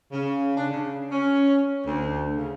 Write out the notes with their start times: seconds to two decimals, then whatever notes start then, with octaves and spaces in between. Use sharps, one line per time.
0.13 C#3
0.57 D4
0.71 C#3
1.12 C#4
1.86 D2
2.36 C#3